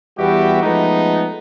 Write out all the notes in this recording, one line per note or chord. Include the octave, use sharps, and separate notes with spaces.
E2 G3 B3 F#4 G4 E5
F3 G#3 A3 B3 D#4